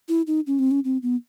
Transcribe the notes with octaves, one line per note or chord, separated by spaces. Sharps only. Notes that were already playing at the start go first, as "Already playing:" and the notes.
E4
D#4
C#4
C4
C#4
C4
B3